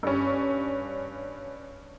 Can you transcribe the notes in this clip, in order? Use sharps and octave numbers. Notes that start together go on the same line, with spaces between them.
G2 C#4